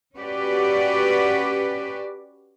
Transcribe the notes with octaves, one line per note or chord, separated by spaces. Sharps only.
C#4 F#4 G4 B4 D5